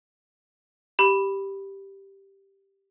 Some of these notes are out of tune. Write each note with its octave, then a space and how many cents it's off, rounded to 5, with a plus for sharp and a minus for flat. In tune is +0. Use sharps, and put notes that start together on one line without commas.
G4 +0 B5 +0